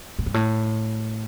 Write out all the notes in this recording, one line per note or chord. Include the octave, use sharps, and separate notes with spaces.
A2
G2
A2